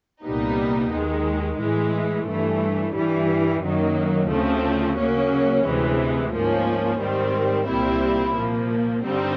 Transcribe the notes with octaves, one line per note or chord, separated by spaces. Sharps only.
C2 A#2 G3 B3 D#4
D#2 D#3 G#3
A2 E3 G#3
G2 E3 A3
G2 E3 G3
F#2 D#3 F#3 A#3
D2 C#3 F3 A3 C4
C#3 F#3 A#3 C#4
D2 C3 E3 G#3
G#2 F3 A#3 C#4
G#2 D#3 G3 C4
C2 A#2 G3 C4 E4
A#2 F3 A#3
G2 D3 G3 C4 D#4